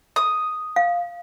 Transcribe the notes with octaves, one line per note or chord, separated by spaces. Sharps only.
D#6
F5